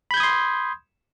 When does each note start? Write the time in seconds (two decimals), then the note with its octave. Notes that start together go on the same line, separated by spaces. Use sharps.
0.11 B5
0.14 G6
0.17 G#6
0.20 D#6
0.23 C6